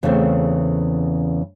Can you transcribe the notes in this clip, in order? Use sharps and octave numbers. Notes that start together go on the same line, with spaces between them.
E2 C#3 E3 A3 C4